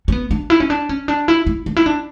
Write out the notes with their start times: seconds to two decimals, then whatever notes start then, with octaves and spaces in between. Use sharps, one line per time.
0.08 C#4
0.12 B3
0.31 D4
0.50 E4
0.60 C#4
0.70 D4
0.89 C#4
1.08 D4
1.28 E4
1.47 E4
1.66 D4
1.77 E4
1.86 D4